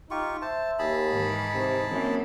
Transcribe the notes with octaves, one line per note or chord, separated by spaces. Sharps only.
D#4 F4 G4 C#6
C5 E5 A5
D#2 G#4 A5 B5
G#2 D#3 E3 D#4
C3
F#2 E3 A#3 C4